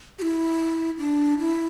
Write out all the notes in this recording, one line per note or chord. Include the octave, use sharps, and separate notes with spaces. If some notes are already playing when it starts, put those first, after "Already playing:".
G4
E4
D4
E4